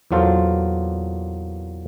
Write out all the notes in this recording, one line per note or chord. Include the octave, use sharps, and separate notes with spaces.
E2 A#2 F#3 F4 A4 C5